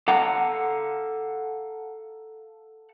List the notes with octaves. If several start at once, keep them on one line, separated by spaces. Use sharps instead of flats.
A4 F5 F#5 A#5